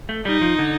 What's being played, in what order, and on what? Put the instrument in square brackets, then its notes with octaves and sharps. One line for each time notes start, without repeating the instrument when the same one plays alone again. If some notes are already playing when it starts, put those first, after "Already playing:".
[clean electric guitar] A3
[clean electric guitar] G3 [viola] D#4
[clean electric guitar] F3
D3